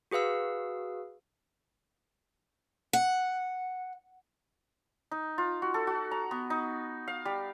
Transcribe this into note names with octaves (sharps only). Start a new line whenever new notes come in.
F#4 G#4 B4 F5 E6
F#5
D#4
F4
F#4
A4
F#4
A#5
B3
D#4
F5
G3